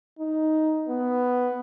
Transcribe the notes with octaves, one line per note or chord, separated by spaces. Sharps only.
D#4
B3